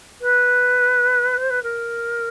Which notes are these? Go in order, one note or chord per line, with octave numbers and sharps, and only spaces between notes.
B4
C5
B4
A#4